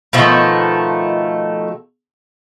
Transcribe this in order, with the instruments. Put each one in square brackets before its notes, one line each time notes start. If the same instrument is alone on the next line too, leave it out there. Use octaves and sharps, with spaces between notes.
[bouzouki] B2 D#3 F3 A3